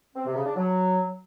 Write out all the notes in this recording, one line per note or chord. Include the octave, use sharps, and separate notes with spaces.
C4
C3
C#3
D4
F#3